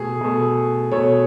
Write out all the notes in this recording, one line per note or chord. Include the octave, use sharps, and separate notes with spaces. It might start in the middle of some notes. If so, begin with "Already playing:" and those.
Already playing: B2 A3 G#4
B2 A3
B2 A3 C#5